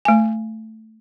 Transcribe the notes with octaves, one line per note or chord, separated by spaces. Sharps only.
A3 G#5